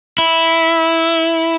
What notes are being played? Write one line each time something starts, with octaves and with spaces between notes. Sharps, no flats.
E4